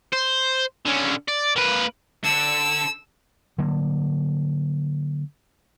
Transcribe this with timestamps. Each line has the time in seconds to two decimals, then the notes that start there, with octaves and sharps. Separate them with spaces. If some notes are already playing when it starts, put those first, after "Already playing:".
0.13 C5
0.86 D3 C#4
1.28 D5
1.56 A#3 B4
2.24 D3 E6
3.58 D3 F#3 A#3